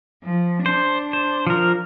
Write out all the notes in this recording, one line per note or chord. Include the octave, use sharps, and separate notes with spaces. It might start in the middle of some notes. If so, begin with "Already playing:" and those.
F3
D4 C5
C5
F3 A#4